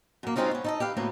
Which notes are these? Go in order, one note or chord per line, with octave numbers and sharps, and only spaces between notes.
F#2 A#3
G#3 C4 C#4 D#4 F4 F#4
B3 C#4
D#4 A4 D#5
G4 B4 F5
D2 A2 A#3 B3